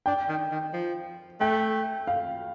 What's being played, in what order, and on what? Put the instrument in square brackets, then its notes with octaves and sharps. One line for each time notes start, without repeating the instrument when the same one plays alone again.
[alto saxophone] D4 [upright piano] G5
[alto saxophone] D#3
D#3
F3
[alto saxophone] A3 [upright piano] G5
[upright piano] F5